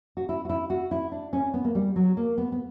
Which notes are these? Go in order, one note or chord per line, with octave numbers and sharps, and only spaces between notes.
F#4
E4
F#4
E4
F#4
E4
D4
C#4
B3
A#3
G3
F#3
A#3
B3
B3